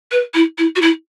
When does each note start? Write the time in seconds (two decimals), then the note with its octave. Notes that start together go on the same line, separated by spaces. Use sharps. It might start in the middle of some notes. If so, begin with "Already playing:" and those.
0.11 B4
0.34 E4
0.58 E4
0.76 F#4
0.81 E4